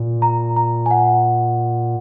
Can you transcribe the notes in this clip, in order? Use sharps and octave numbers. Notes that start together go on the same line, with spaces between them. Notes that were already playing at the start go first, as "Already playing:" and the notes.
Already playing: A#2
A#5
A#5
G#5
F#5